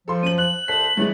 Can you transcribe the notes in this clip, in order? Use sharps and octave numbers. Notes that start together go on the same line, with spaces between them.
F3 A4 C6
F#2 D#7 F#7
F#6 F#7
C2 A4 C5 B6
G2 C#3 E3 G#3 A3